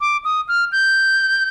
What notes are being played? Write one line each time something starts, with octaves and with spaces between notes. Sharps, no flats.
D6
D#6
F6
G6